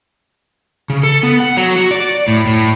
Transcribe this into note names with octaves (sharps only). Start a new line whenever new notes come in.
C#3
A4
B3
F#5
F#3
F#4
D5
A2
A2